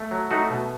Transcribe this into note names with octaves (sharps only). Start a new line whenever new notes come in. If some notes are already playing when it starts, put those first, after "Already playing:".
Already playing: A3
F#3
A3 D#4 F#4
B2